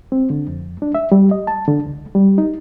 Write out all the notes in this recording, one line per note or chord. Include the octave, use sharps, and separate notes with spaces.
C4
D3
F2
D4
E5
G3
D#5
A5
D3
C#2
G3
D#4